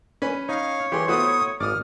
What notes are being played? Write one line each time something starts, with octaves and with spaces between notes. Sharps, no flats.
C#4 B4 G#5
D#4 C#5 F5
E3 G4 G#4 C6
A3 B3 E4 F#4 B4 C5 D#6
G#1 D5 D6 D#6 F6